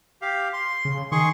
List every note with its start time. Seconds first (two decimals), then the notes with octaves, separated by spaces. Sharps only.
0.22 G4 F5
0.53 C6
0.85 C#3
1.12 D#3 G#4 C6 C#6